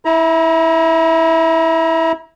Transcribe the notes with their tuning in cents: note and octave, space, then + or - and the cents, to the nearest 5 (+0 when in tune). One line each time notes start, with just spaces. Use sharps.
E4 -15 A#5 +30